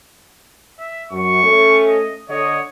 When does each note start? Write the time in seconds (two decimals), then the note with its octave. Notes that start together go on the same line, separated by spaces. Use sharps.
0.79 E5
1.11 F#2 C#6
1.44 A3 C#4 A4
1.87 D#5
2.29 D3 C#5 D#5